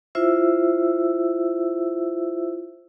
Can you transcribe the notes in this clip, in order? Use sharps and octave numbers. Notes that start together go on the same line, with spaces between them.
E4 F4 C5 E5 E6